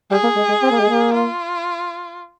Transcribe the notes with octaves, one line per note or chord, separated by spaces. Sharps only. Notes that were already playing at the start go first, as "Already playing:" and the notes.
G3 G#4
A#3
G#3
G#3
C4
A#3
G#3
A#3
F4